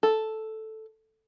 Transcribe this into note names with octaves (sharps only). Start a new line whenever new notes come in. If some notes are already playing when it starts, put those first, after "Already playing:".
A4